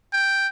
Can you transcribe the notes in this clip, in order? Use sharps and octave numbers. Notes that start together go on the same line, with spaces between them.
G5